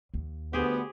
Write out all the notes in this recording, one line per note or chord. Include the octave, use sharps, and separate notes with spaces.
D#2
D2 B3 G4 G#4 C5